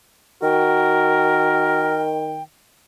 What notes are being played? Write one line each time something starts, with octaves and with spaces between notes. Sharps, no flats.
D#3 F#4 A#4 G5